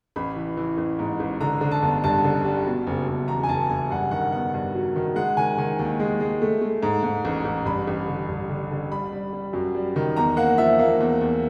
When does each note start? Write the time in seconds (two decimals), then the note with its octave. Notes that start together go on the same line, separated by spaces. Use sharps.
0.16 A1 B5
0.36 E3
0.57 E3
0.78 A1
0.99 G#2
1.20 A1
1.41 D3 A#5
1.61 D3
1.71 A5
1.82 G1
2.04 G2 A5
2.24 D3
2.45 G3
2.66 B2
2.87 F#1
3.08 F#1
3.28 E2 A#5
3.43 G#5
3.49 F#1 A5
3.69 F#1 G#5
3.91 G2 F#5
4.11 D#3 F#5
4.32 B3 F#5
4.54 G2
4.75 F#3
4.96 D#3
5.16 G#3 F#5
5.37 D#3 G#5
5.58 D#3 G#5
5.79 D#2
6.00 G#3
6.21 G#3
6.42 A3
6.61 A3
6.83 G#2
7.03 G#2
7.25 A1
7.45 A1
7.66 G2 B5
7.87 A1
8.08 D3
8.28 G2
8.50 D3
8.71 D3
8.91 G3 B5
9.12 G3
9.33 G3
9.53 F#2
9.75 G3
9.96 D#3
10.17 E2 A#5
10.37 A#3 F#5
10.58 F3 E5
10.79 A#3
11.00 E2
11.21 E2